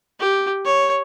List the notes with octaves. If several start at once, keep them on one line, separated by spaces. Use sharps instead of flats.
G4
C#5